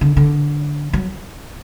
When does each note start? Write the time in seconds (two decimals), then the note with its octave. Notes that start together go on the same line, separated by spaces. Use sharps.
0.01 D3
0.17 D3
0.93 F#3